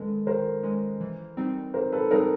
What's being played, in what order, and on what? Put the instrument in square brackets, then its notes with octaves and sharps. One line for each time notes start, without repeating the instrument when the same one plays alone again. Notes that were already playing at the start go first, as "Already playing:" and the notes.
Already playing: [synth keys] D#3 G#3 C#4 [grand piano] A4 B4
[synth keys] D#3 [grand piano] A#4 C5
[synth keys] G#3 C#4
E3
G3 C4 D#4
[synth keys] E3 [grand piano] A#4 C5
[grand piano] A4 B4
[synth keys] G3 C4 D#4 [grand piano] G#4 A#4